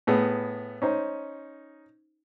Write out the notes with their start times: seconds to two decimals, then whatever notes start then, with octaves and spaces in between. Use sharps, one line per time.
0.07 A2 B3 G#4
0.82 C#4 D#4 C5